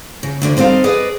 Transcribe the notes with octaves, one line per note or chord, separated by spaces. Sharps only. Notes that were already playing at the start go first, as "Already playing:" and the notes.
C#3
D2 D3 D4
G3 C4 D#4 A4 F5
G#4 B4 D5 D#5